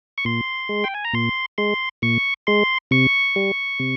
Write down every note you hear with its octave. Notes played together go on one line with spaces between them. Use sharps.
C#6
A#2 C6
G#3
G5
G#5
A#5
A#2 C6
G#3 C6
A#2 C#6
G#3 C6
C3 C#6
G3
C3